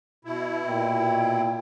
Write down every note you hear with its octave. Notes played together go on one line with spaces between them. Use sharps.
B2 E4
A#2 G5